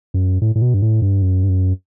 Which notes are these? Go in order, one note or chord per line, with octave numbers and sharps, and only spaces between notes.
F#2
A2
A2
B2
G2
A2
G2
F#2
G2
F#2